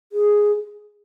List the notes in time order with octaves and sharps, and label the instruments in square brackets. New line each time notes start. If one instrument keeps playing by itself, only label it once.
[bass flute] G#4